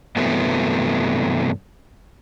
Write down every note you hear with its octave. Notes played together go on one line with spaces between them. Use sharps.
G2 C3 E3 F#3 A3 B3